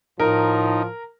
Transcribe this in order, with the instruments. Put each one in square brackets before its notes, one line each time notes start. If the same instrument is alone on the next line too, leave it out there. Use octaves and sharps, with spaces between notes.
[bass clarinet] A2 [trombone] F3 [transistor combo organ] D#4 [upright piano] A#4